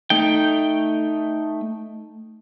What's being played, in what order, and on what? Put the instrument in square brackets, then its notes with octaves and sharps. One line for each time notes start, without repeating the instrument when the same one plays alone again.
[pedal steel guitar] A3 D#4 G5